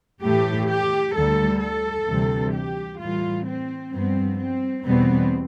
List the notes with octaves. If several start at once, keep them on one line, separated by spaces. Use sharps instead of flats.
A2 E3 A3 G4
G4
D2 D3 G3 A4
A4
D2 C3 E3 G3
G4
A2 E3 G3 F4
C4
G2 F3 B3 C4
C4
E2 B2 G3 B3 C4